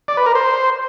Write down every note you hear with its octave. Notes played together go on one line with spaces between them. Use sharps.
D5
B4
A#4
C5